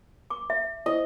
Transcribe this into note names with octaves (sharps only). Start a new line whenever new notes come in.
D6
E5
E4 C5 D#5